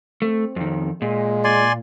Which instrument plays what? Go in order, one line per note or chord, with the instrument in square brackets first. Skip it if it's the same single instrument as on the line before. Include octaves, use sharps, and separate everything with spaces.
[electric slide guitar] A3 [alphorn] C4
[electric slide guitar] F2 D#3
[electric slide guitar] A#2 [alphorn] G#3
[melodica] D5 G#5 C6